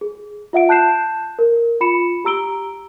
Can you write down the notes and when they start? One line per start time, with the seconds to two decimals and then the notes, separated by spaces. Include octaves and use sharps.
0.01 G#4
0.53 F4 E5 F#5 D7
0.69 A5 F#6 G6 C7 E7
1.39 A#4
1.81 F4 B5 C#7 E7
2.25 G4 A#5 E6 D7 G7